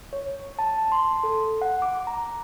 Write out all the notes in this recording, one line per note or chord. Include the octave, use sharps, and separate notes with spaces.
C#5
A5
C6
A4
F#5
D6
A#5